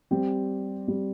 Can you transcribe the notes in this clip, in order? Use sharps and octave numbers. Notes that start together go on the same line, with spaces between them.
G3 C4 G4
G3 C4 G4